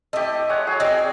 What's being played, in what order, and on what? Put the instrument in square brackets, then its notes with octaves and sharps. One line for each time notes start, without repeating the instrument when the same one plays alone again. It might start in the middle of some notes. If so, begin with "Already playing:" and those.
[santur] A3 G4 [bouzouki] E4 D#5
[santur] G#3 C#5 F#5
F#3 G#4
[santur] C4 [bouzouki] D#4 G#4 D5